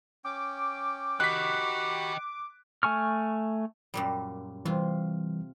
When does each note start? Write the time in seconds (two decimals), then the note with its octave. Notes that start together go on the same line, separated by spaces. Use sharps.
0.25 C#4 G5 D6
1.20 F#4 G4 D#5 G5 B5 F#6 B6
2.83 A3 G#5 C#6 F6
3.94 F#2 A#2 G3
4.65 C3 E3 G3 F4